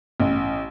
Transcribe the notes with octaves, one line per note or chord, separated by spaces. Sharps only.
A1